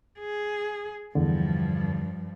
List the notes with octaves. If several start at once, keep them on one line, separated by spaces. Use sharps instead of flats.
G#4
E2 G2 D3 F3